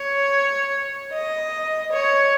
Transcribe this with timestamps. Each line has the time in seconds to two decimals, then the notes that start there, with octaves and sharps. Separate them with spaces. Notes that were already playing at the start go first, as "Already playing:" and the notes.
Already playing: C#5
1.12 D#5
1.92 C#5